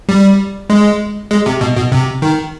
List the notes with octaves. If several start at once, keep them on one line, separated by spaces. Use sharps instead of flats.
G3
G#3
G#3
C3
B2
B2
C3
D#3